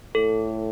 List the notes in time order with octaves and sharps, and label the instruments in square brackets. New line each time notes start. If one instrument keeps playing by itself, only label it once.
[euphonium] A2 [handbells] A4